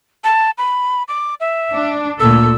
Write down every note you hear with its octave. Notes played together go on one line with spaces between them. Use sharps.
A5
B5
D6
E5
D4
D2 A#2 A4 E6